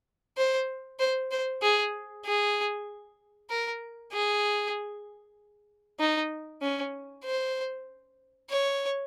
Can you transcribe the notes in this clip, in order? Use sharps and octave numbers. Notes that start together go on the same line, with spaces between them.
C5
C5
C5
G#4
G#4
A#4
G#4
D#4
C#4
C5
C#5